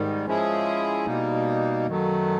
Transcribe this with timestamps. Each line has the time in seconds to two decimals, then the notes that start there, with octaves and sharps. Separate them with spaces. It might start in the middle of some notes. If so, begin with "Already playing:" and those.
Already playing: G#2 D#3 G3
0.26 F3 G#3 C#4 E4 G#4
1.06 B2 G3 A#3 D#4
1.87 F#2 D#3 F#3 A3